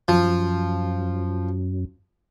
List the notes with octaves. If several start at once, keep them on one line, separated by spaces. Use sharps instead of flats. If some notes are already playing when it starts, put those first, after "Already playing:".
F#2 F3